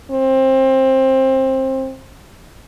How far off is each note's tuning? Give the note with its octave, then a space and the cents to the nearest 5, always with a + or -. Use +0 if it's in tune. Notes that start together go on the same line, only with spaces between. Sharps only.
C4 +20